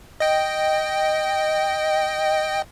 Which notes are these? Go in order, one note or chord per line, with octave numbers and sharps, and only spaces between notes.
D#5 G5